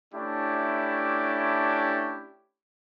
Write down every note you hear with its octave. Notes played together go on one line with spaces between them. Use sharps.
A3 C#4 D4 E4 G4